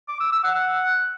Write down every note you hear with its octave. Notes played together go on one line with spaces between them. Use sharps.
D6
E6
E6
F#5